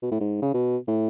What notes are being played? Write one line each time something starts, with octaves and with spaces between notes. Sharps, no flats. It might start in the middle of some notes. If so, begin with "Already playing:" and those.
B2
A2
G#2
C#3
B2
A2